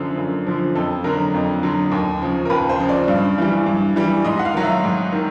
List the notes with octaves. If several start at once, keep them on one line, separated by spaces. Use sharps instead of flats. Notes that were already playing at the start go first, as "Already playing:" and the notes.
Already playing: F#2 D3 F3
F#2
D3 F3
F2 A4
D3 F#3 A#4
F2
D3 F#3
D#2
C#3 F3
A#4
D#2 B4
C5
C#3 F3
D5
G2
E3 G3
G2
E3 G3
G#2 D#5
F#5
F5
D#3 F#3
E5
G#2
D#3